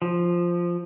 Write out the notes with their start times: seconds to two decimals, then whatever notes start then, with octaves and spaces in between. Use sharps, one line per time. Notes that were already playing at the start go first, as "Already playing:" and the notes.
0.02 F3